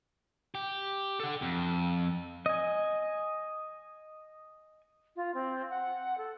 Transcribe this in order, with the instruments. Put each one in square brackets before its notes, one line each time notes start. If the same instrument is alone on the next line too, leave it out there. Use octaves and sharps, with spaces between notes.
[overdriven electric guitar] G4
A4 F#5
F2
[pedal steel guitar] D#5 G#5
[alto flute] F4
C4
F#5
A4